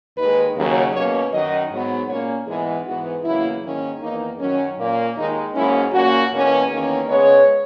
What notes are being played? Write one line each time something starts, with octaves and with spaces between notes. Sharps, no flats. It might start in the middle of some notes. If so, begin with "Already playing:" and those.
D#2 D#3 G#3 B4
D#2 C#3 F#3
B2 A#3 C#4 C#5
F#2 D#3 F#3 D#5
G#2 F#3 B3
A#2 A#3 C#4 C#5
G#2 E3 G#3 B3 G#4
G#2 E3 B3 F#4
E2 C#3 F#3 A#3 E4
G#2 D#3 A#3 C#4
E2 D#3 A#3 D#4
F#2 D#3 F#3 C#4
A#2 A#3 C#4
D#2 D#3 G#3 D#4
G#2 F#3 A#3 C#4 E4
A#2 A#3 C#4 F#4
E2 B2 A#3 C#4
E2 D#3 A#3 C#4
C#3 G#3 B3 C#5